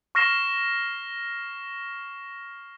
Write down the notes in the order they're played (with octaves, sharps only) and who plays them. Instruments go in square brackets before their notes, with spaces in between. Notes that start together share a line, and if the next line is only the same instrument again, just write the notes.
[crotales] C#6 F6 A#6 C7 E7 G7